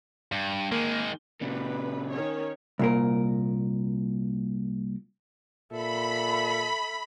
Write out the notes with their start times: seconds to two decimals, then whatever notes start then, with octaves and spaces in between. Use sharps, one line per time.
0.32 G2
0.72 D#3 G#3 A#3
1.41 A#2 C#3 B4
2.11 D#3 C#4 C#5
2.79 C2 A#2 A#4
5.72 A#2 A4 E5 B5